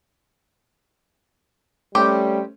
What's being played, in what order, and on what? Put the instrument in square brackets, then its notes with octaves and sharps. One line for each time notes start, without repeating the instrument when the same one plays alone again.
[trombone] G3 [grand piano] A3 C#4 [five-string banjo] C4 G4 G5